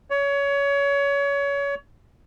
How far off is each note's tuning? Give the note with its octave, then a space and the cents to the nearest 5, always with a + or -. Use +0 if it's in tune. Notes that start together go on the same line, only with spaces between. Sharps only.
C#5 +25